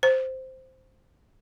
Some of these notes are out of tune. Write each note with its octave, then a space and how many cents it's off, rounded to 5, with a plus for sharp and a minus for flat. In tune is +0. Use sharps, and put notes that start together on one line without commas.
C5 -5